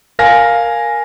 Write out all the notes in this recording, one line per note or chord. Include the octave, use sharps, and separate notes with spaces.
A#4 F5 G#5 A#6